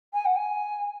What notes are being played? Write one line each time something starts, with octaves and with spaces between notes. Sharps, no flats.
G#5
F#5
G#5